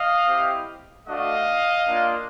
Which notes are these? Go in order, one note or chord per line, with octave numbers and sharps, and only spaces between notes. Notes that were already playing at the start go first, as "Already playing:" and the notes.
Already playing: D#5 F5
C4 E4 G4
A3 D4 F#4 D#5 F5
A#3 D4 F4